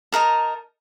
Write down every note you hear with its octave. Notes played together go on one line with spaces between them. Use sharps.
D#4 E4 A#4 A5